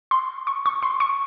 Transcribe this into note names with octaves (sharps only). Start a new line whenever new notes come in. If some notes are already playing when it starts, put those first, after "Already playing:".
C6
C#6
C#6
C6
C#6